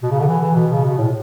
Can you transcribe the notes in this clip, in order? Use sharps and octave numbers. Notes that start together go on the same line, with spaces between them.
B2
C#3
D3
E3
E3
B2
C#3
B2
A2